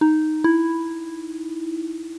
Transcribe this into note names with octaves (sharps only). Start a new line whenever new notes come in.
D#4
E4